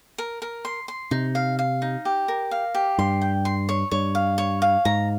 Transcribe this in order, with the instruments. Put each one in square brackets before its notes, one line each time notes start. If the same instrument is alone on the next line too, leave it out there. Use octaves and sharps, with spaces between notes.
[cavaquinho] A#4
A#4
C6
C6
[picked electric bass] C3 [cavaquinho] D#4
[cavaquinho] F5
F5
D#4
G4
A#4
F5
G4
[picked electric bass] G2 [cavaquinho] C6
[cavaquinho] G5
C6
C#5
[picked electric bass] G2 [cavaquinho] C#5
[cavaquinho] F5
C#5
F5
[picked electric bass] G#2 [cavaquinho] A#5